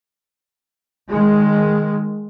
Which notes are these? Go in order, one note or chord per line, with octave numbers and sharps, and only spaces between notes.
D#3 G#3